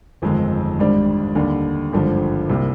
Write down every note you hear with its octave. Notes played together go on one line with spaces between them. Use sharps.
G1 F2 D#3 G#3 D#4
G#1 G#2 G3 D4
D#2 D3 G3
G#1 G2 D3 F3
C2 C3 G3 A#3